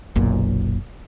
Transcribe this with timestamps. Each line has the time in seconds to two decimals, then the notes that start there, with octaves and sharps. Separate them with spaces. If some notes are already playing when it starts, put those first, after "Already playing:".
0.16 F#1 B1 F#2 A#2